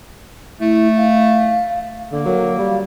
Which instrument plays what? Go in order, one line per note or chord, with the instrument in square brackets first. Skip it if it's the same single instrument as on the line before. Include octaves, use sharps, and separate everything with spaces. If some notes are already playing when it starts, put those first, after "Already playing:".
[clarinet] A3 [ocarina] E4
[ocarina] F5
[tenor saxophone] D3 [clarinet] A#3
[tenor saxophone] F#3 [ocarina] A#4
[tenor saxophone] G3 [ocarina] F5